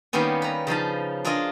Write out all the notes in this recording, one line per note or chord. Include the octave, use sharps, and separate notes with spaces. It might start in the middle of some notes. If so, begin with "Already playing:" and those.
D#3 G3 A#3 B3 C#4
B4 A#5
C#3 F3 D#4 A5
D4 F4 G#4 A#4 D#5